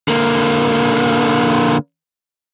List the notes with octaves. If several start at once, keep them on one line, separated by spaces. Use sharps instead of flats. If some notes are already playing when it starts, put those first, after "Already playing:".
D3 A#3